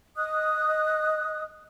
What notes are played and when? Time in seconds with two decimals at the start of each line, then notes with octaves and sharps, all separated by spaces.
0.16 D#5 D#6 F#6